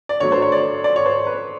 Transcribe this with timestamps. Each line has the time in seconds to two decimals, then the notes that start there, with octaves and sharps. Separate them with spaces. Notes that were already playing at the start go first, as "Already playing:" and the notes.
0.09 D5
0.20 D3 F#3 A3 C#5
0.32 C5
0.42 C#5
0.52 D5
0.84 D5
0.96 C#5
1.06 C5
1.27 B4